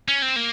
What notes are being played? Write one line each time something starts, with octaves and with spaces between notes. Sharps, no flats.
C#4
C4
A#3